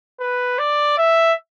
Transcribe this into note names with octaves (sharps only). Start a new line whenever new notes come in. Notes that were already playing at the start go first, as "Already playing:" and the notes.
B4
D5
E5